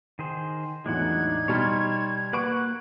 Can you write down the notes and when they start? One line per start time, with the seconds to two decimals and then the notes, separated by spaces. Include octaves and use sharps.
0.19 D#3 G#4 C5
0.86 E2 A2 F#3 G#3 D4 D#4 F#5 G#6
1.48 B2 G3 C#5 A5 C6 F6
2.33 A#3 B4 F#5 C#6 D6 D7